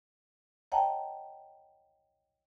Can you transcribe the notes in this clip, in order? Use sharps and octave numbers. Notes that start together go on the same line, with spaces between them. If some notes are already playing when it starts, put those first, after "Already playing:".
C#5 D#5 F#5 G5 A5 A#5